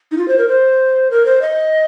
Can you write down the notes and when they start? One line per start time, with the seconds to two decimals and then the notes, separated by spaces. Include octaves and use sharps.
0.12 D#4
0.18 F4
0.28 C5
0.38 A#4
0.48 C5
1.11 A#4
1.26 C5
1.42 D#5